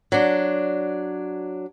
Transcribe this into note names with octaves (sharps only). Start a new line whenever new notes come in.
F#3 D4